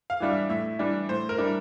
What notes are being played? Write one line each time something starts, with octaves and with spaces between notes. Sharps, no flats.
F5
E3 G3 D4
E5
A2 E5
E3 G3 D4
A2 C5
A#4
E3 G3 D4